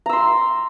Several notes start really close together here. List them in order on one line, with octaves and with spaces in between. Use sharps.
A#5 E6 C6